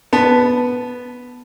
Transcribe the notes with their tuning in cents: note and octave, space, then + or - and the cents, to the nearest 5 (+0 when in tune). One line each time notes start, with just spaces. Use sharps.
B3 +0 A5 +0